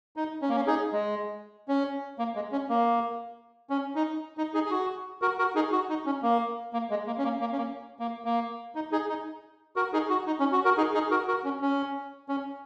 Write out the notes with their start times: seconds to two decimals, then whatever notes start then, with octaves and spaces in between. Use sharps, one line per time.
0.16 D#4
0.42 C#4
0.49 A#3
0.56 C#4
0.67 D#4 G#4
0.92 G#3
1.68 C#4
2.19 A#3
2.35 G#3
2.52 C#4
2.69 A#3
3.70 C#4
3.95 D#4
4.38 D#4
4.54 D#4 G#4
4.66 G#4
4.71 F#4
5.22 F#4 A#4
5.38 F#4 A#4
5.55 D#4 G#4
5.72 F#4
5.89 D#4
6.06 C#4
6.23 A#3
6.73 A#3
6.90 G#3
7.07 A#3
7.18 C#4
7.24 A#3
7.40 A#3
7.52 C#4
7.58 A#3
7.99 A#3
8.25 A#3
8.75 D#4
8.92 D#4 G#4
9.09 D#4
9.76 F#4 A#4
9.93 D#4 G#4
10.10 F#4
10.27 D#4
10.40 C#4
10.52 F#4
10.65 F#4 A#4
10.77 D#4 G#4
10.94 D#4 G#4
11.11 F#4 A#4
11.28 F#4 A#4
11.44 C#4
11.62 C#4
12.29 C#4